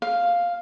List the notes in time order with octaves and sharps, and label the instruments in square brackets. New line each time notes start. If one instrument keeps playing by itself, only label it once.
[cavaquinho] F5